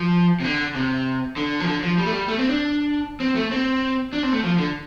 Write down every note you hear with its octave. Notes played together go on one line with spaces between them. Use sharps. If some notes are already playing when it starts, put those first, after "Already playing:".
Already playing: F3
C3
D3
C3
D3
F3
D3
F3
G3
A3
G3
A3
C4
D4
C4
A3
C4
D4
C4
A3
F3
D3